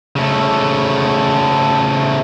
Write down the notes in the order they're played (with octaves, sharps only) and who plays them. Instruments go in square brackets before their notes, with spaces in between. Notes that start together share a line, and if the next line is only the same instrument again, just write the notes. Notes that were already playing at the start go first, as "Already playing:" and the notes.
[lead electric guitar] C#3 A3